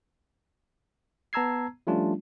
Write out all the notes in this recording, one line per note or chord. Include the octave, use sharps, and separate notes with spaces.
B3 A5 A#5 E6 G#6 C7
F3 G3 A3 C#4 D4 F4